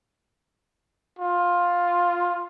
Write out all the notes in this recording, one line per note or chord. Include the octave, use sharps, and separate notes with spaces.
F4